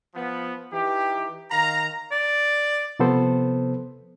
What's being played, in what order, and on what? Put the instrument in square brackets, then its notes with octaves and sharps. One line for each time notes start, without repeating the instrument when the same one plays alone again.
[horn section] F3 B3
E3 D#4 G4
D#3 F5 A#5
[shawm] D5
[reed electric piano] C3 F3 B3 A4 C5